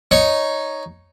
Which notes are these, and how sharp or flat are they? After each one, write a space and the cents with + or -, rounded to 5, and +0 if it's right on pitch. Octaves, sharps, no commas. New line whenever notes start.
D#4 +0 C#5 +0